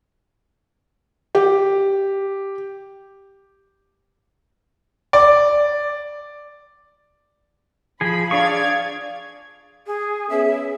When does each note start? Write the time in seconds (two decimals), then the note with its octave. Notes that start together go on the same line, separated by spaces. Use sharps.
1.35 G4
5.13 D5
8.01 F3 G#4 B5
8.31 D4 G#4 D5 F5 C#6 G#6
9.86 G#4
10.29 B3 C#4 G#4 E5